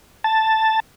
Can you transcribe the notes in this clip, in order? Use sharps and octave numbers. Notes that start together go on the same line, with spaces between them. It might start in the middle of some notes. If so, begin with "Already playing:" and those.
A5